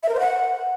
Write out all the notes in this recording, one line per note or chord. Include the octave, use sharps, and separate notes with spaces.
E5
A#4
C5
F#5